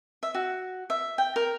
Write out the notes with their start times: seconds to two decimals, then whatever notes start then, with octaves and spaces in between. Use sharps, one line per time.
0.23 E5
0.34 F#4
0.90 E5
1.18 G5
1.36 A#4